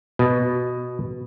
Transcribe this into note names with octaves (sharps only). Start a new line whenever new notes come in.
B2